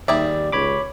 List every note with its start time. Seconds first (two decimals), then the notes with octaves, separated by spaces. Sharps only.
0.08 D#2 G3 G#4 D5 E5
0.52 C#2 C#5 B5 D6